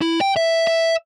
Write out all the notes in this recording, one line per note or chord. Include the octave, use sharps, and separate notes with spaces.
E4
G5
E5
E5